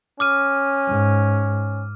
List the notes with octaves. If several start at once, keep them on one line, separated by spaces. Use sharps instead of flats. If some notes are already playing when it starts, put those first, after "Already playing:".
C#4 D6 F6 D#7
G#2